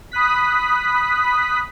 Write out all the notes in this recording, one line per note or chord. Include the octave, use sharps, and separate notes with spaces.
B5 D#6 F#6 B6